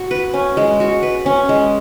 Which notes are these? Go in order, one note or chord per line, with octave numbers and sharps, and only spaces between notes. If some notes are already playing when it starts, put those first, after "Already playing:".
Already playing: F#4
B4
C#4
G#3
F#4
B4
C#4
G#3